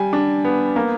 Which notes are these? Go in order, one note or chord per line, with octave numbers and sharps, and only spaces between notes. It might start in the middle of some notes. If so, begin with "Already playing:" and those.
Already playing: G3 G#5
D4
B3
A#3